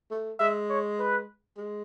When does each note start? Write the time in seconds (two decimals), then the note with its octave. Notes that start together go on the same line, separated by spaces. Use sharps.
0.11 A3
0.39 G#3 E5
0.69 C#5
0.99 B4
1.57 G#3